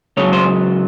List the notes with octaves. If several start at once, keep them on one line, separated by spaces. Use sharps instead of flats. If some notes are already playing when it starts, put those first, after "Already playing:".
C#2 C#3 F#3 C#5
C5